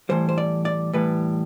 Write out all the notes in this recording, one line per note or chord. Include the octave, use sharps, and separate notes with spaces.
A2 E3 G3 C5
C5
D5
D5
A2 E3 G3 B4